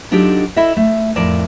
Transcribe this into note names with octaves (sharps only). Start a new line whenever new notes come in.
F#3 D4 D#4 F4 G4 A4
E4 A4 D#5 E5
A3
F2 A2 A#4 D5 A5